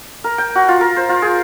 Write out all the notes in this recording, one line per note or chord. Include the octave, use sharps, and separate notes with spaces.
A#4
G5
F#4
F4
A#4
C5
F4
G#4